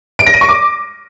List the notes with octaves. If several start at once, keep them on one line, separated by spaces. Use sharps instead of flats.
D7
A#6
D#7
C#6
D6